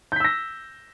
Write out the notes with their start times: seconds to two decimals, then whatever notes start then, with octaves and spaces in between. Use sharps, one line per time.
0.12 G6
0.16 B6
0.20 E6
0.25 A#6